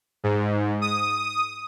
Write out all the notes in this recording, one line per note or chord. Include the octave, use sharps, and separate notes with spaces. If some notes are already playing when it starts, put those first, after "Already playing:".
G#2
D#6